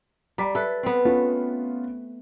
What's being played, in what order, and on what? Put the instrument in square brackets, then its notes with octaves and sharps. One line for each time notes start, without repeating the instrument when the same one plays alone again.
[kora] G3 [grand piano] A#5 D6 B6
[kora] A4 B4 [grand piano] E5
[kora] B3 C4
[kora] A3 [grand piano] B3 C#4 F4